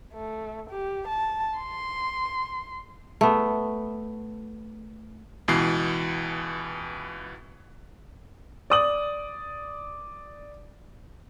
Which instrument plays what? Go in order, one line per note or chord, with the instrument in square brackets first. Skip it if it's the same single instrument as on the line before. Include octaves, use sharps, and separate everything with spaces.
[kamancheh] A3
G4
A5
C6
[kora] A3 B3
[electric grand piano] C#2 B2 E3 C7
[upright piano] D5 D#6 F#7